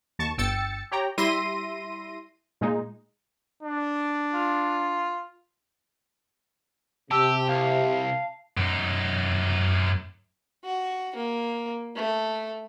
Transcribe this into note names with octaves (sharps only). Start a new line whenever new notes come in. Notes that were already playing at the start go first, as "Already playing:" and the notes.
D#2 A5 C#6
G1 G5 E6 A6 C#7
G4 C#5 G5 A#5
G3 E4 E5 C6 A#6 D#7
A#2 G#3 D#4
D4
F4
C3 G4 A5 E6
C2 F5
F#2 D#4
F#4
A#3
A3